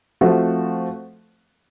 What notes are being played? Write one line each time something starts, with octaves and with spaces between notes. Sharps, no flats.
F3 A3 C4 F#4